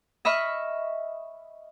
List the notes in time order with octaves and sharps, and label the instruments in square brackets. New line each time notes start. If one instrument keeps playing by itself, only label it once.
[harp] D#5 E5 B5 C#6 F6